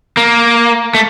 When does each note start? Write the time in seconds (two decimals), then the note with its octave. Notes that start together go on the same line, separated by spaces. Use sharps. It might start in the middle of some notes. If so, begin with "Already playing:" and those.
0.17 A#3
0.95 A3